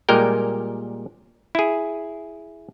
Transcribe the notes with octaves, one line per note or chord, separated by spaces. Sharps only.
A#2 G3 G#3 A#4 G5
E4 G#4